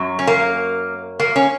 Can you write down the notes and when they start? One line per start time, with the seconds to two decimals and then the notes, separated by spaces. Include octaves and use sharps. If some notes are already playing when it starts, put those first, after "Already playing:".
Already playing: F#2 F#3
0.19 C#4
0.27 A#3
1.19 A#3
1.36 C#4